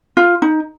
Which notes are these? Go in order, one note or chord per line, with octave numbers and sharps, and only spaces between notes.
F4
D#4